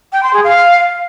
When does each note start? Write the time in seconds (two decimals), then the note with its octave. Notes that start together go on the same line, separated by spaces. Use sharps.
0.12 G5
0.23 C6
0.33 G#4
0.44 F5